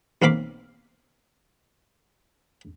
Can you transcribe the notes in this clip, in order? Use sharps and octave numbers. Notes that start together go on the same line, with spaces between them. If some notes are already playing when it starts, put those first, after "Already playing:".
B1 A#3 C4 F5 B5 D6